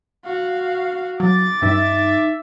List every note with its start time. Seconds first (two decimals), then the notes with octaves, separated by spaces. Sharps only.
0.25 F#4 F5
1.20 F#3 D6 A6
1.62 G2 D#4 E5